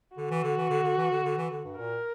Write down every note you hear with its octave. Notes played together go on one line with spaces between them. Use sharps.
D3 F#4
E3
D3
E3
D3
D3
E3
D3
D3
E3
D3
G2
A#2 A#4